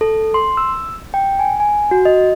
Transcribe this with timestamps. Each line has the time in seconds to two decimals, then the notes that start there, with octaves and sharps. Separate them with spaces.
0.01 A4
0.34 C6
0.57 E6
1.14 G5
1.39 G#5
1.60 G#5
1.91 F#4
2.05 D#5